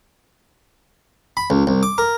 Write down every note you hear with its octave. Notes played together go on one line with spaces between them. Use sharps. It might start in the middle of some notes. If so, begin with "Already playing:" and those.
B5
C#2
C2
D6
A#4